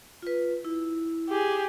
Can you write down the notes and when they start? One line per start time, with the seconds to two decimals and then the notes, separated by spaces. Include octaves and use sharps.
0.22 F4 B4
0.65 E4
1.29 G4 G#4